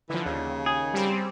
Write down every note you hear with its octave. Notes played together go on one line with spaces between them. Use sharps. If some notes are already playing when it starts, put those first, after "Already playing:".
D3 E3 F3
D#2 C#3
G#4
G3 C4